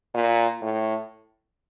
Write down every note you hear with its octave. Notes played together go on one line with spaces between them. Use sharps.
A#2
A2